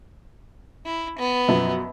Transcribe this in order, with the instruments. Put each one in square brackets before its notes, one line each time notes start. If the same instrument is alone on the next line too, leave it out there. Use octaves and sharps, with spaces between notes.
[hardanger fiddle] E4
B3
[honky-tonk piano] F#2 B2 F3